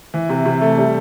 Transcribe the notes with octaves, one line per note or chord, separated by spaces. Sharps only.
E3
C3
C3
A3
G3